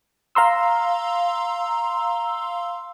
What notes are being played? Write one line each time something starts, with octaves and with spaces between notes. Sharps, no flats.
F5 A#5 C6 E6